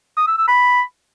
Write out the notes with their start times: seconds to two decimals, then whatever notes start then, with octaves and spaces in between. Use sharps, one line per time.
0.17 D#6
0.27 E6
0.38 E6
0.48 B5